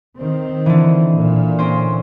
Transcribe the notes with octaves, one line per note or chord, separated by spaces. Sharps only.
D#3 C4
D3 E3
A#2
C4 C#4 C5